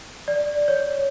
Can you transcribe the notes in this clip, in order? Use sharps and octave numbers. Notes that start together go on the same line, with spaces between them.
D5
C#5